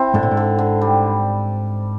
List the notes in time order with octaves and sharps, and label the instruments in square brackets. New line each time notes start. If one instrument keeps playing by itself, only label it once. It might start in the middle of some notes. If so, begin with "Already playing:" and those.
Already playing: [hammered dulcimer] C4 E4
[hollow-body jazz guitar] G#2 [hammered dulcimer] D3
[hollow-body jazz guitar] A2
G#2
[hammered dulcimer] D3
D3
G3